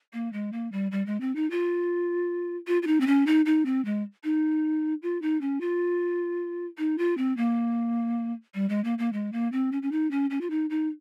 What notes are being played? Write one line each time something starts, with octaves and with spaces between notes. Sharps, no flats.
A#3
G#3
A#3
G3
G3
G#3
C4
D#4
F4
F4
F4
D#4
C4
C#4
D#4
D#4
C4
G#3
D#4
F4
D#4
C#4
F4
D#4
F4
C4
A#3
G3
G#3
A#3
A#3
G#3
A#3
C4
C#4
C#4
D#4
C#4
C#4
F4
D#4
D#4